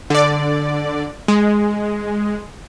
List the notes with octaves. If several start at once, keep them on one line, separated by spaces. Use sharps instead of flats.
D3 D5
G#3